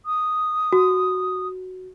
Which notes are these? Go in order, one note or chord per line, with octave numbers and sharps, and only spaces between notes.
D#6
F#4